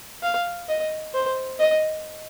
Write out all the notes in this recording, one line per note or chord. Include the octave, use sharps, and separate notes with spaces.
F5
D#5
C5
D#5